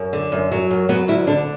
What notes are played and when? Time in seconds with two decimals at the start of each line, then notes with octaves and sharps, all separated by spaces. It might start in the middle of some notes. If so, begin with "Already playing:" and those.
Already playing: F#2
0.13 D3
0.32 F#2
0.52 F#3
0.71 F#2
0.89 F#3 B3
1.08 D2 E4
1.27 D3 D4